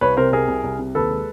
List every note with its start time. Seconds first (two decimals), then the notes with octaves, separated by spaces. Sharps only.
0.01 C2 B4 C#5
0.17 C3 A#4 C5
0.32 C2 G#4 A#4
0.48 C2
0.64 C2
0.79 C3
0.95 D#2 A4 B4
1.11 G#3